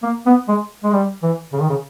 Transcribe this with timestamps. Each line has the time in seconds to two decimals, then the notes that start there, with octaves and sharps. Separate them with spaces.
0.03 A#3
0.26 B3
0.48 G#3
0.83 G#3
0.93 G3
1.22 E3
1.53 C#3
1.61 D#3
1.69 C#3